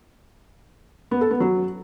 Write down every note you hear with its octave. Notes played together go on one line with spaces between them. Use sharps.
B3
A4
B3
F#3